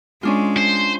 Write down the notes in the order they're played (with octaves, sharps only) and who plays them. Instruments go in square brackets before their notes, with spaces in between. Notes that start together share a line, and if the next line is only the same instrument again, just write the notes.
[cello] G#3 [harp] C#4 D4 F4
[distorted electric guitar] C5